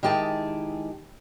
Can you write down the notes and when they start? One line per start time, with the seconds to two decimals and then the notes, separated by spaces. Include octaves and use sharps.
0.03 D#3 G#3 E4 G4 G#4 A5